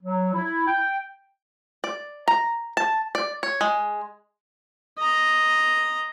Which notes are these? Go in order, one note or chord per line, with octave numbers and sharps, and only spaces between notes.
F#3
E4
G5
D5
A#5
A5
D5
C#5
G#3
D#5 A#5